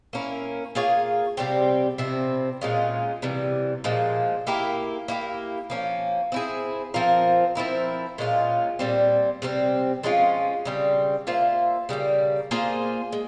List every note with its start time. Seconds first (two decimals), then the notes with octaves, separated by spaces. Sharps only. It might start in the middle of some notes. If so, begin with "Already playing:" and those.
0.13 A#3 C#4 E4 A#4
0.75 A#3 F4 G#4 C#5
1.37 C3 G3 C4 G4
1.98 C3 F3 C4 E4
2.61 A#2 G#3 C#4 F4
3.22 C3 E3 G3
3.84 A#2 F3 G#3
4.47 A#3 E4 G4 A#4
5.08 A#3 E4 G4
5.70 F3 A#3 C#4
6.32 C4 E4 G#4
6.94 F3 C4 F4 A#4
7.55 F3 C4 E4 A#4
8.18 A#2 G#3 C#4 F4
8.79 A#2 G3 C4
9.42 C3 G3 C4
10.03 F3 G#3 C#4 F4
10.65 C#3 G3 C4
11.27 A#3 F4 C5 E5
11.89 C#3 G3 A#3
12.51 A#3 F4 G#4 C5
13.12 G#3